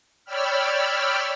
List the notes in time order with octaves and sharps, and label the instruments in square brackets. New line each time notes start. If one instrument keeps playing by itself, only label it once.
[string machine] C#5 D5 G5 B5 E6 F6